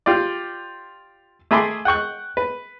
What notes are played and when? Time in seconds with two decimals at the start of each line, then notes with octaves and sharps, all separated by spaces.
0.06 F4 G4 D5
1.51 A3 G#4 E5 B5 C6 D6
1.85 F#5 G5 C#6 F#6
2.37 B4